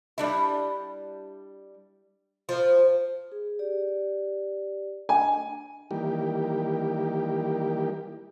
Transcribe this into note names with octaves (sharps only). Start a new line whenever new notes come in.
G3 D4 E4
F3
G#4
G4 D5
D4 D#5 G#5
D#3 E3 G3 A#3 G4